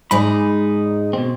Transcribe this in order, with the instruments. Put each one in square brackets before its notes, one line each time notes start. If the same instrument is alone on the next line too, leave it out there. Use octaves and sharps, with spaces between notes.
[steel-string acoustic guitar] G#2 G#3 D#4 [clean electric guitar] D5 G#5 B5
[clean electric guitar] B2 C4